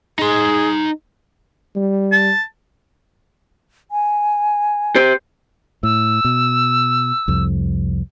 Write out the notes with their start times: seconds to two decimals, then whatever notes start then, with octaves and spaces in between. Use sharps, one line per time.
0.19 D#4 G#4 C6
1.76 G3
2.12 A5
3.91 G#5
4.95 G4 C5
5.83 A2 E6
6.25 B2
7.28 C2 F2